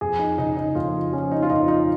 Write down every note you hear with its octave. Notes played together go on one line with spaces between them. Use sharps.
F2 G#4
D#4
C#3 D#4
D#4
F2 F4
F3 C#4
D#4
F4
F2 D#4
D#4